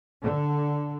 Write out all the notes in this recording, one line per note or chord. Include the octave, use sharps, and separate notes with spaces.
D3